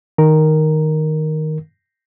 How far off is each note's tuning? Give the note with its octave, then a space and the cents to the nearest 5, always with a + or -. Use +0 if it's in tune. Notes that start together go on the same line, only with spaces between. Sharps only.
D#3 +0 A#4 +0